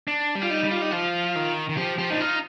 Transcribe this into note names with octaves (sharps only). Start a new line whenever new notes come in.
D4
G3
F4
D#4
G3
F4
D#4
F3 F4
D#3
D#3
F3 G4
F3 G4
D4 D#4
D#4 F4